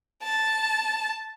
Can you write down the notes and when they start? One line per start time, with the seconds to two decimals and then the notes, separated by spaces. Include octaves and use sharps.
0.24 A5